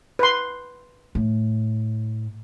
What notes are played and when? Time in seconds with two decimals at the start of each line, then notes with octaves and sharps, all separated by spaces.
0.19 B4 C6
1.15 A2